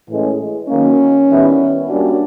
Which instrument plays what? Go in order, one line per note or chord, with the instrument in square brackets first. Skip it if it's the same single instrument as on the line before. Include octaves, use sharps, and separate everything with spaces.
[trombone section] A2 E3 G#3 C#4
[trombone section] D#3 F#3 A#3 [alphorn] C#4
[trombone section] D#3 G3 B3 E4
[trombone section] G3 A#3 C#4 F#4 [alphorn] D4